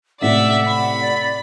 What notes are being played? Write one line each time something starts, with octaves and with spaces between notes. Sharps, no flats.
A2 C3 A3 D5 E5 F#5
B5
D5